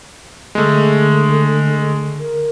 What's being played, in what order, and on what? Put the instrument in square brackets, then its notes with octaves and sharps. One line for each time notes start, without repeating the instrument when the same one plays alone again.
[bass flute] D3 [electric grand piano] G#3 A3
[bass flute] A#4